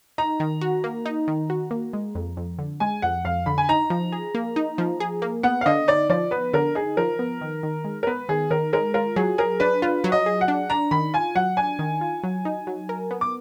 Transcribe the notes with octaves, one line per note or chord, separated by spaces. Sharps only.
D#4 A#5
D#3
F#4
A#3
D#4
D#3
F#4
A#3
G#3
F2
F2
D3
G#3 G#5
F2 F#5
F2 F5
D3 B5
G#5
D#4 A#5
F3
G#4
A#3
D#4
F3
G#4
A#3
B3 F#5
F5
D3 D#5
D#4 D5
F3 D5
B3 B4
D3 A#4
D#4 G#4
F3 A#4
B3
D#3
D#3
G#3
A#4
B3 B4
D#3 G#4
D#3 A#4
G#3 A#4
F4 A#4
F#3 G#4
G#4 A#4
D4 B4
F4 B4
F#3
D#5
G#4
F#5
D4
D4 A#5
D#3 B5
F4 G#5
F#3 F#5
D4 G#5
D#3
F4
F#3
D#4
F#3
A#4
B3
D6